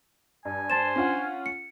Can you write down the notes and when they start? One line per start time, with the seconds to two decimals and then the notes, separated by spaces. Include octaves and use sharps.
0.45 G2 G#5
0.70 C5 A5 A6 E7
0.96 C#4 D4 F4 F#5
1.46 C#7